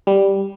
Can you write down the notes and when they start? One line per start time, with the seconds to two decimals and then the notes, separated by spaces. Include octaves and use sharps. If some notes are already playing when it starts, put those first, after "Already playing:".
0.07 G3